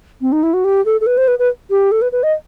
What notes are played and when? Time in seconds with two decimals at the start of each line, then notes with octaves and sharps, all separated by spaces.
0.21 C4
0.32 D#4
0.43 E4
0.53 F#4
0.64 G4
0.85 A4
1.01 A4
1.06 B4
1.17 C5
1.28 B4
1.39 B4
1.70 G4
1.91 A4
2.02 B4
2.12 B4
2.23 D#5